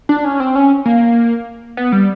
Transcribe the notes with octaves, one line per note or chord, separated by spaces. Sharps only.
D4
C#4
C4
C#4
A#3
B3
G3